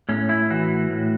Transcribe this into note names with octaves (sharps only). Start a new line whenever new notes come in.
A2 C#4
E4
E3 F#4
A2